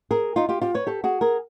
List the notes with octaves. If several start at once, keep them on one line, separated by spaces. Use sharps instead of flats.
G#4 A#4
D#4 F4
F4 G4
F4 G4
B4 C#5
G4 A4
F#4 G#4
G#4 A#4